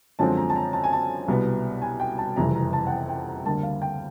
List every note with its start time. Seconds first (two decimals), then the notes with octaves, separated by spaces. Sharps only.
0.19 F#2 D3 F3 G#3 C4 A5
0.37 A#5
0.50 A5
0.56 A#5
0.73 A5
0.84 G#5
0.93 A5
1.28 C2 B2 G3 B3
1.82 G#5
2.00 G5
2.18 A5
2.36 F#1 F2 C3 E3 G3 A#5
2.55 A#5
2.73 A5
2.87 F#5
2.90 G5
3.09 G5
3.27 A#5
3.46 D2 D3 G3 A#3 A5
3.63 F5
3.82 G5